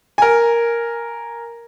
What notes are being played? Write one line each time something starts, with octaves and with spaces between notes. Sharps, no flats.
A#4 G#5